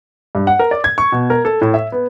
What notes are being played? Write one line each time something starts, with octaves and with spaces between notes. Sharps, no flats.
G2
F#5
A#4
D5
G#6
C#6
B2
A#4
A4
A2
E5
B3